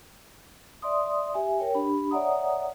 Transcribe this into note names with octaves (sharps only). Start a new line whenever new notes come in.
D5 E5 C6 D#6
G4 E5 G#5
A#4 C#5 G5
D4 G4 B5
C#5 D5 E5 F#5 A#5 D#6